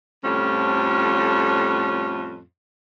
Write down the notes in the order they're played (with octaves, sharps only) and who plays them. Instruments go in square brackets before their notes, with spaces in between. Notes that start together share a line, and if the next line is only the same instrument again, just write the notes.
[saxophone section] F2 A2 F3 G3 C#4